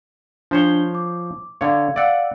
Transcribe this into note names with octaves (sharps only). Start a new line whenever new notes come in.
F3 D4 C5 C#5 G7
D6
D3 C#5 F5 G#6
D5 F5 F#5 E6